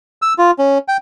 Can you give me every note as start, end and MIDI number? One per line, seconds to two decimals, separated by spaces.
0.22 0.33 88
0.38 0.51 65
0.59 0.78 61
0.88 0.97 79